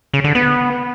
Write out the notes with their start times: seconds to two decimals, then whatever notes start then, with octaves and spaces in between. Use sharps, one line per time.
0.14 C#3
0.24 D3
0.35 B3